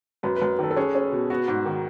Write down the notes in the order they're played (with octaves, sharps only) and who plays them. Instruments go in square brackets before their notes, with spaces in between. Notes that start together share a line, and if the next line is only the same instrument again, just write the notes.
[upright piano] F#2 [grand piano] B4
[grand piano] B4
[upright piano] F#2
[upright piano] D#3 [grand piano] A4
[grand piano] A4
[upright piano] C#4 [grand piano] G#4
[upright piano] C#4
B2
[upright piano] B3 [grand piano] F#4
[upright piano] G#2
D#3